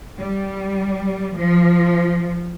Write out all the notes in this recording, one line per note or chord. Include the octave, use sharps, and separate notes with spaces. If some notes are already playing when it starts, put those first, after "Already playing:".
G3
F3